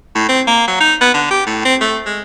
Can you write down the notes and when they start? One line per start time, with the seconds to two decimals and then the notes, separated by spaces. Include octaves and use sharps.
0.15 A2
0.29 C4
0.47 A#3
0.68 F#3
0.80 D#4
1.01 B3
1.14 D3
1.31 G4
1.46 A2
1.65 C4
1.81 A3
2.06 G#3